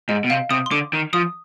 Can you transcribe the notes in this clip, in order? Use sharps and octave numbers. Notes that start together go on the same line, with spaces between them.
G#2 D#5
B2
C3 F5
C3 D#6
C6
D3 D6
D#3
F3 D#6